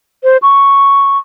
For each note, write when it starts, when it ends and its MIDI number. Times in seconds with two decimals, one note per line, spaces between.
0.24 0.37 72
0.42 1.18 85